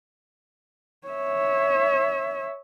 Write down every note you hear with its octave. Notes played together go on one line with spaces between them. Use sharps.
C#5 E5